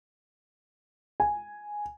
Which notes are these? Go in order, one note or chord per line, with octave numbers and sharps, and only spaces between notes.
G#5